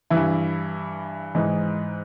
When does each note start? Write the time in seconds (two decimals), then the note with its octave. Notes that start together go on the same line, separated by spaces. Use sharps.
0.10 G2 E3 E4
1.35 G#2 E3 D#4